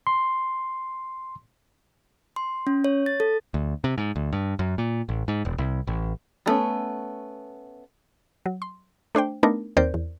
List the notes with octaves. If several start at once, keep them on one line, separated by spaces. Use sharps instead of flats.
C6
C6
C#4
C#5
A6
A4
D2
C3
G#2
D2
G2
F#2
A#2
A1
G#2
E1
C2
A1
G3 A3 B3 C#4
F#3
C6
A3 D4 C5 G5
A3 B3 D4 D#4 A#4
D#2 C4 A#4 C5 D5 G6
E2